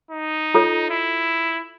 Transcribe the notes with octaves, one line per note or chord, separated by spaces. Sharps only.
D#4
F4 A4 C#5
E4